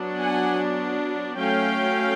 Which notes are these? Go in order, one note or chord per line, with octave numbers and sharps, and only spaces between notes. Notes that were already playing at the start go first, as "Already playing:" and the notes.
Already playing: F#3 B3 D4
F#5 G#5
F#3 A3 C#4 F5 G5